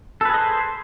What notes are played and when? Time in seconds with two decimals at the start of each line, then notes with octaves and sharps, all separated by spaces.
0.21 A4
0.25 B4
0.30 G#4
0.34 D#5
0.38 C5